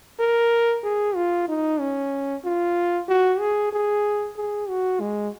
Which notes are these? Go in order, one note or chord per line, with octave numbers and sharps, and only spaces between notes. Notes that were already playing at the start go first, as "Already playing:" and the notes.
A#4
G#4
F4
D#4
C#4
F4
F#4
G#4
G#4
G#4
F#4
G#3